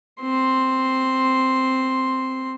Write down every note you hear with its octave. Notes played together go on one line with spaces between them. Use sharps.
C4 C6